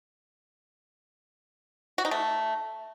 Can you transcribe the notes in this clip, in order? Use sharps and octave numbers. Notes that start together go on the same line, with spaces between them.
F#4
D#4
A3